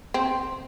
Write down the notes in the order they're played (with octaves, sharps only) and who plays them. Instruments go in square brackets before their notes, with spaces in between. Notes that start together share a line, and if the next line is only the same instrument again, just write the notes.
[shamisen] C4